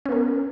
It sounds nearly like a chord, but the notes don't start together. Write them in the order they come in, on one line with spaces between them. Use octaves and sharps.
C#4 B3 A#4